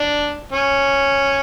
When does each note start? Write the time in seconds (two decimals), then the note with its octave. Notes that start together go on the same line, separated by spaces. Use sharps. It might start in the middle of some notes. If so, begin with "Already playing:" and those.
Already playing: D4
0.52 C#4